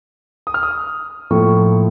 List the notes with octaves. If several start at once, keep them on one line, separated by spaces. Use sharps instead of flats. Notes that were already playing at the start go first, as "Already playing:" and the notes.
D#6
F6
D#6
A2 F3 A#3 C#6